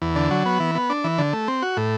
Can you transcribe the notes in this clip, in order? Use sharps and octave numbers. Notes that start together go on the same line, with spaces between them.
E2
D3
F#3
B3
E3
B3
D4
E3
D3
A3
C4
F#4
A2